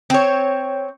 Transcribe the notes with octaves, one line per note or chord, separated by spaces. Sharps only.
C4 C#5